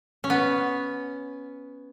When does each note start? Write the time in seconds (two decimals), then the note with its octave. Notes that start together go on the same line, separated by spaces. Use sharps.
0.24 C#4
0.30 B3